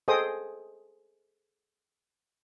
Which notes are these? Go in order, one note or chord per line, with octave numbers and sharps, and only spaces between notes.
G#4 A4 C5 D#5 G5 D#6